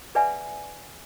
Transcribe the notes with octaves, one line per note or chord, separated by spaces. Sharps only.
G#4 B4 D5 E5 F#5 G#5